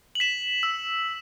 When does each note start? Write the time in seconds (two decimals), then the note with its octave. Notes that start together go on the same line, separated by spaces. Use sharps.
0.15 F#7
0.20 B6 E7
0.63 E6